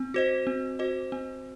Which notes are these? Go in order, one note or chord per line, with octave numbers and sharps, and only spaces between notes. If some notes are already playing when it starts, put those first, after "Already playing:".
Already playing: C4
F#4 C5 D#5
C4
F#4 C5 D#5
C4